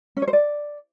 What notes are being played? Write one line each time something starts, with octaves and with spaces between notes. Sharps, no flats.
C#4
C#5
C5
D5